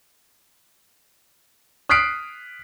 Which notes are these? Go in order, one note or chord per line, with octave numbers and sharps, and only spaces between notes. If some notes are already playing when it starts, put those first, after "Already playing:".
D#6 F6 F#6 B6 C7 D7